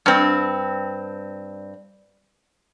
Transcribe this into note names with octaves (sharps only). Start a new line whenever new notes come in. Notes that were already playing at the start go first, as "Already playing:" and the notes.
G2 C4